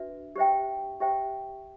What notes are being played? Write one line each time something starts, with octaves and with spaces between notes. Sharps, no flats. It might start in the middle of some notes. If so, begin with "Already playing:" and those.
Already playing: D4 F#4 B4 E5
G4 C5 E5 G5
G4 C5 E5 G5